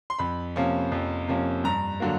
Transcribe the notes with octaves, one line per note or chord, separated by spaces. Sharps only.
C6
F2 B5
C3 F3 A#3 C#4
F2
C3 F3 A#3 C#4
G2 A#5
D3 F#3 A#3